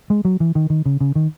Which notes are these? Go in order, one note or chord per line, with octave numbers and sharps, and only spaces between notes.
G#3
F#3
E3
D#3
D#3
C#3
C#3
D#3